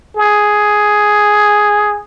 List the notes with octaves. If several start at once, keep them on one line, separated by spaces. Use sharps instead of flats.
G#4